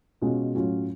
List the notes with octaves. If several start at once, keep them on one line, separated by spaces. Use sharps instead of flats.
B2 G#3 C#4 F4
A2 F#3 C#4 F4